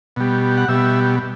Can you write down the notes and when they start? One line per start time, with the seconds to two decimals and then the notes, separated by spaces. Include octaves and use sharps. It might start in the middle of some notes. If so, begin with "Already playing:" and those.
0.16 B2 G3
0.57 F#5
0.68 B2 G3 E5